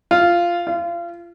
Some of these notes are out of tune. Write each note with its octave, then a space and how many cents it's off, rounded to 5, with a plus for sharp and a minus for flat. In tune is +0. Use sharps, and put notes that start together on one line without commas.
F4 -10
F4 -30